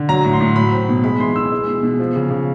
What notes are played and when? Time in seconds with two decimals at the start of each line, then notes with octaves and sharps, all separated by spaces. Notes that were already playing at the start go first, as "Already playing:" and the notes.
Already playing: D3
0.09 F#3 A#5
0.24 A2
0.33 C6
0.41 A2
0.56 F#3 B5
0.72 C4
0.89 B2
1.04 G#3 B5
1.20 E3 C6
1.36 E3 E6
1.52 G#3
1.67 B2
1.83 B2
1.99 F3
2.16 C#3
2.31 C#3